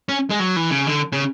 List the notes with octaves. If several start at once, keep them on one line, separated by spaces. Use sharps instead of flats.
C#4
G#3
F#3
E3
C#3
D3
C#3